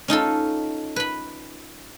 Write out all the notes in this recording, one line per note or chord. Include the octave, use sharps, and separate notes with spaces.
C#4 D#4 F4 A4
B4 B5